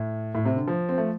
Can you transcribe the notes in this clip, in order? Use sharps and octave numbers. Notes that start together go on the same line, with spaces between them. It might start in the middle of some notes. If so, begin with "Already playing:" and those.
Already playing: A2
A2
C3
D3
F3
C4
A3